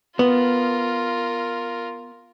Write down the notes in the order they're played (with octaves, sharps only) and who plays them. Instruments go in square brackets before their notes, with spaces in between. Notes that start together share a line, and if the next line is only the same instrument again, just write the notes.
[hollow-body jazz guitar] B3 [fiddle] F4 A#4